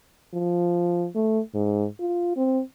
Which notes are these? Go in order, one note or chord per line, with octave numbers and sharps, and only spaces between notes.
F3
A3
G#2
F4
C4